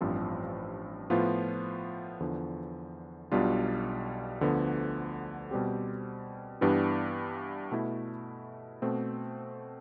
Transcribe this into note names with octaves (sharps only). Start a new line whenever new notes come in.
A1 G2 F3 C4
A2 F3 B3 F4
E2 D3 F3
B1 B2 G3 D4 F4
D2 D3 F3 B3
B2 G3 C4 G4
G2 E3 B3 D4 G4
B2 A3 E4
B2 A3 C4